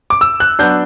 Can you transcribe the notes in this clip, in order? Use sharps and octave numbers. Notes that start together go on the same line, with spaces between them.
D6
E6
F#6
F#3 B3 D4 G6